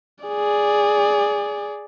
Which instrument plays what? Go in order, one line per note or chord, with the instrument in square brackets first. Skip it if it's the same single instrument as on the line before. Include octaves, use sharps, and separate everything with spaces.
[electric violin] G#4 D5